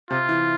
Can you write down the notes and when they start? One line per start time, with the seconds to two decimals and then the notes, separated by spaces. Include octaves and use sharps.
0.10 C3 F4
0.29 E3